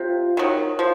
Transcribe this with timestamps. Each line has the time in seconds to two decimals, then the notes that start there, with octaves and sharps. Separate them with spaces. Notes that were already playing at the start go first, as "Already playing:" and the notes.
Already playing: C3 F4
0.37 D#3 F#3
0.79 F3